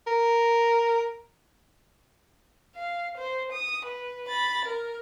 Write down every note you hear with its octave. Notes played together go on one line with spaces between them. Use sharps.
A#4
F5
C5
D#6
B4
B5 A6
A#4